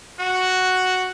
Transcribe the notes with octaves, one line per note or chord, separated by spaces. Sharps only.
F#4